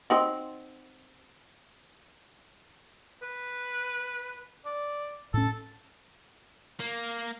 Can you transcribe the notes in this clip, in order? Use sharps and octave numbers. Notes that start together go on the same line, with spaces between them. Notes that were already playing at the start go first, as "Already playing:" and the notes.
C4 D#4 F#4
B4
D5
A2 C#4 A4
A#3